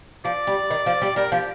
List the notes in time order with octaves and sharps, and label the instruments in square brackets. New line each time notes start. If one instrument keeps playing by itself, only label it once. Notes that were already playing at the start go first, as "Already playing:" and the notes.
[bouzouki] F3 [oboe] D5
[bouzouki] G3
D#3
F3
G3
[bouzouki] G3 [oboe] A#4
[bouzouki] F3 [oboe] G4